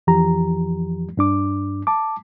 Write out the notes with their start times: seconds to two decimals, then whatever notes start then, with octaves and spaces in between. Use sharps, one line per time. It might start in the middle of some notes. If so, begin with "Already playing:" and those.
0.07 F2 E3 F3 G4 A#5
1.17 G2 D4 D6
1.87 A5 D6